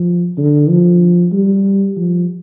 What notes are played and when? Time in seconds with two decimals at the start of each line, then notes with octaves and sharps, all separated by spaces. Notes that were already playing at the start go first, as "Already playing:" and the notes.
Already playing: F3
0.37 D3
0.69 F3
1.32 G3
1.97 F3